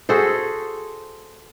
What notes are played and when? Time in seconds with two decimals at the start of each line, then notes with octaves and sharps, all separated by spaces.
0.09 F#4 G#4 A4 C5